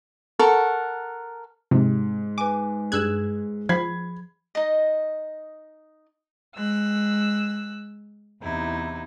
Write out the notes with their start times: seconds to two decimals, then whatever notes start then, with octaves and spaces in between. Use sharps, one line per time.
0.39 A4 A#4 F#5 C#6
1.71 G#2 C3
2.38 B4 G#5 D6
2.92 G2 G#4 E6 F#6 G#6 E7
3.69 F3 B5 G#6 B6 C7
4.55 D#4 D#5
6.56 G#3 E6 F#6
8.42 E2 C3 D#4 E4